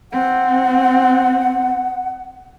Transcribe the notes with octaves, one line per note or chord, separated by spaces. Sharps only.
C4 F#5